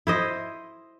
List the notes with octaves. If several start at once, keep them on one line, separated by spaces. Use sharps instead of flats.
E4 C5 D#5